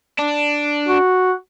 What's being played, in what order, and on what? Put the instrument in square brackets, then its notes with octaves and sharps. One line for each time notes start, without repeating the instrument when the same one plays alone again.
[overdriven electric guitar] D4
[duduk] F#4